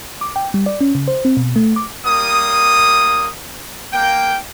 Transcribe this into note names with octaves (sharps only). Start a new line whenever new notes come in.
D6
G5
G3
D5
C#4
C#3
C5
C4
B2
A3
D6
G3 A#3 D#6
A#3 G5